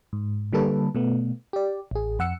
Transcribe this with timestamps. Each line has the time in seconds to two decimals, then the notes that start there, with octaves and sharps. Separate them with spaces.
0.13 G#2
0.53 D3 G3 A#3 A4 B4
0.95 B2 A3 B3
1.53 G4 D5
1.91 A1 G#4
2.19 F2 F#5 E6 C#7